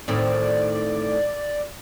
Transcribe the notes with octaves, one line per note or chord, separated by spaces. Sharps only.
A2 D#3 C4 D5